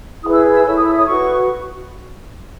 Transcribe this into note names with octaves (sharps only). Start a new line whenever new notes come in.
E4 G#4 B4 D#6
E6
E6
E4 A4 C#5 E6
D#6
E6
D#6
F#4 B4 C#6